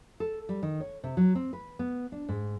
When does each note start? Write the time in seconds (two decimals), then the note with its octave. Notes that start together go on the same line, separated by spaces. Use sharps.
0.20 A4
0.49 G3
0.63 D#3
0.81 C#5
1.04 C3
1.17 F#3
1.35 C4
1.53 B4
1.79 B3
2.12 D4
2.29 G#2